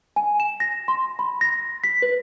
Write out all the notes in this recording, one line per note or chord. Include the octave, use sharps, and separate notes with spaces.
G#5
E7
A#6
C6
B5
A#6
B6
B4